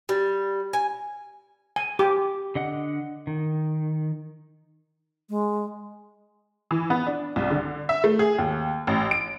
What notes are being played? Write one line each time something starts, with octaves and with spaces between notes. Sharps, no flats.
G3
G#5
G#5
G4 D6
D3 D#5 F#5
D#3
G#3
E3
B3
D4
C2
D3
E5
A3
G#4
D#2
A1
D7